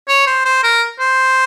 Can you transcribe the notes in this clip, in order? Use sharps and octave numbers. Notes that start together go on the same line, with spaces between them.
C#5
C5
C5
A#4
C5